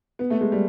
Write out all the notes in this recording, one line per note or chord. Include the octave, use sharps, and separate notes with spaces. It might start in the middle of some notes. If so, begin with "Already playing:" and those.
B3
A3
G#3
G3